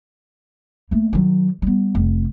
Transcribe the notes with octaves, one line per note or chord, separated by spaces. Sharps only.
A3 A#3
D#3 F#3
G3 B3
F1